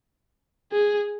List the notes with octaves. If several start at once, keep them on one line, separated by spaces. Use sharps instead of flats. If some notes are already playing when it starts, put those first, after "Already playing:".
G#4